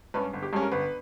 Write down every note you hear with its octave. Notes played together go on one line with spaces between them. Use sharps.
G2 G3 C#4 B4
G1
G4
G2 G3 C#4 G#4
A#4
G1 B4